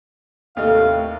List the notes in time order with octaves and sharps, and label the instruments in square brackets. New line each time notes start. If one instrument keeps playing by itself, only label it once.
[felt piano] D#2 A4 D#5 [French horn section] A2 C3 A3 [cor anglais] F5